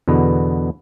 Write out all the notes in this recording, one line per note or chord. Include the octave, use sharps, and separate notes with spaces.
E2 B2 D3 B3